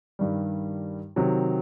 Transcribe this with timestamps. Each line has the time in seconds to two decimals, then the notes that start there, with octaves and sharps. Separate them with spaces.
0.19 G2 D#3 G3
1.16 C3 D#3 F#3